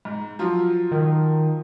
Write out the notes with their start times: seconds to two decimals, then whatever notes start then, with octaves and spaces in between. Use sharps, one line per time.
0.05 G#2
0.39 F3 F#3 F4
0.92 D#3